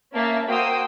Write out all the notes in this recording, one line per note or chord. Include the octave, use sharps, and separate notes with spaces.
A#3 C#4 E5 A5
A#3 F#4 C5 G5 D#6 E6